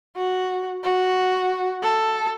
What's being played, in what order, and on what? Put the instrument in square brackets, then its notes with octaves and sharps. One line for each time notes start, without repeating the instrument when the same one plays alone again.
[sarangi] F#4
F#4
A4